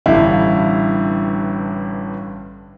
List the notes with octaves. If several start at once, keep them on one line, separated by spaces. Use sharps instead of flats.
A1 G2 D3 E4 F5